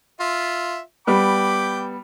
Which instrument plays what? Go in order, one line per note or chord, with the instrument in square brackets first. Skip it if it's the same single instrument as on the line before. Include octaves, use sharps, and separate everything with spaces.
[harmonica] F4 E5
[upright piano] G3 B3 [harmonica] G5 B5 D6